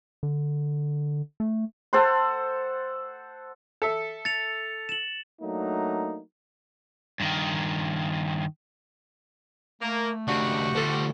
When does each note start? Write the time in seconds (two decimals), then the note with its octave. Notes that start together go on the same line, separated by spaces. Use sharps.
0.23 D3
1.40 A3
1.93 A4 C5 F#5 C6
3.82 A4 E5
4.25 A6 C#7 F7
4.89 E7 F#7
5.42 F#3 A3 A#3 D4 D#4
7.20 G2 D#3
9.81 A3 A#3
10.28 D#2 C#3 D4 F#4 G4
10.75 D2 F3 G3 A4